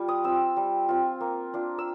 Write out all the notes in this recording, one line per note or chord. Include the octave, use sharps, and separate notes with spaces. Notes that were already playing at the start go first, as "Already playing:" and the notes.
Already playing: G3 F4
D#6
C4 F4 E6
G3
C4 F4
A#3
D4 F4
E6